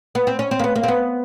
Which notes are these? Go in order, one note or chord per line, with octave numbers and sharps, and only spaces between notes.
B3
C4
C#4
C4
A#3
B3
A#3
C4
B3